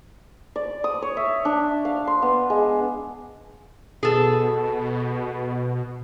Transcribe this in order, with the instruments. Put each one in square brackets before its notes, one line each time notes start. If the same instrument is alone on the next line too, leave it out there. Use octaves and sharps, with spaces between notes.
[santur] D5
D#6
C#5
E5
D4
F5
C6
B3
G#3
[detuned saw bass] B2 [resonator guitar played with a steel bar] G#4 A4